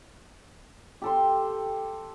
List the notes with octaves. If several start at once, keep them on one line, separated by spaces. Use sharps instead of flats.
G4 A4 C6